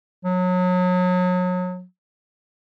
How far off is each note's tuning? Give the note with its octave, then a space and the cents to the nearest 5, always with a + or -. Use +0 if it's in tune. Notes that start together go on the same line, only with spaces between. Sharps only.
F#3 -30